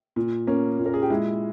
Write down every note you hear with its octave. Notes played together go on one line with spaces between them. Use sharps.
A#2
A#3 C#4
A#2
A#4
G#4
G4
G#3 E4